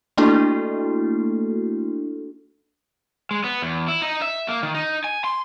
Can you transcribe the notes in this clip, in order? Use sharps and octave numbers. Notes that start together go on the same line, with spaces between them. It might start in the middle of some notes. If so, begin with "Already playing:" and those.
A3 A#3 D4 E4 F#4 A4
G#3
B3
E2
E4
D#4
E5
A#3
D#3
D#4
G#5
C6